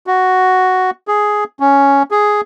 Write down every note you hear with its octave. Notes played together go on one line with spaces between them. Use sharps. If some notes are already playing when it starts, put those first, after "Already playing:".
F#4
G#4
C#4
G#4